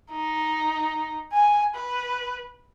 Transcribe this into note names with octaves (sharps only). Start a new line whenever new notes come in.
D#4
G#5
B4